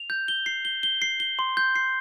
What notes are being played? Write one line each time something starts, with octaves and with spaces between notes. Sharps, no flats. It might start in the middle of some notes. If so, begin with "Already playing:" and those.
Already playing: F7
G6
G7
C7
G7
G7
C7
G7
C6
G6
C7